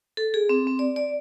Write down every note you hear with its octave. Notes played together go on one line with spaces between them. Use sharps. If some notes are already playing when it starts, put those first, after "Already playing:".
A4
G#4
C4
C4
D5
D5